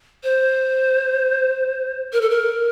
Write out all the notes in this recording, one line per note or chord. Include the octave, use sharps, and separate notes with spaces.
C5
A#4
A4
A#4